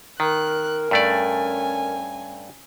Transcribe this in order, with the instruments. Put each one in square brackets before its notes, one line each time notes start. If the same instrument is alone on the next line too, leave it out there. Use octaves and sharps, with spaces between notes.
[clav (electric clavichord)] D#3 [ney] A#4 [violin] F#6
[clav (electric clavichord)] G2 A3 D5 [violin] C#4 G#5